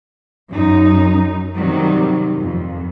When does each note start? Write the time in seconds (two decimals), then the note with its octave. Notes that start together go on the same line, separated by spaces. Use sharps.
0.51 F#2 D#4
1.55 C3 D#3 F#3 G3
2.39 F2